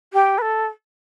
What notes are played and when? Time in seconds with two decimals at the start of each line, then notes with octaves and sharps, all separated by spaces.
0.14 G4
0.38 B4
0.42 A4